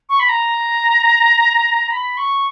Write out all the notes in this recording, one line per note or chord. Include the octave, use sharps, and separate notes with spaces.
C#6
B5
A#5
B5
C#6